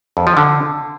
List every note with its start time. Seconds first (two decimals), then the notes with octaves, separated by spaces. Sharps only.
0.17 F2
0.27 F3
0.37 D3